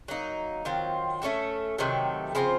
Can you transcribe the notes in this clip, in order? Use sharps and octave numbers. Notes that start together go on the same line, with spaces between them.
F#3 A#3 D#4
D#3 F#3 C4 F4
A3 C#4 F#4 A4
C3 D#3 F#3 A3
C#3 F3 C4 F4